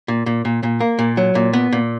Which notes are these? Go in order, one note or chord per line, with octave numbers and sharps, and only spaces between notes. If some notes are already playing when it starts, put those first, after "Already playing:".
A#2
A#2
A#2
A#2
A#3
A#2
F#3
A#2
B3
A#2